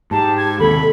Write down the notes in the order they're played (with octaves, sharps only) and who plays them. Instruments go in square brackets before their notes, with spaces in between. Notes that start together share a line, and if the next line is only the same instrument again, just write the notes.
[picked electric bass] G#2 [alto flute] G4 [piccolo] A5
[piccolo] G#6
[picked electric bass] D#2 C3 [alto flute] A4 [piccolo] B5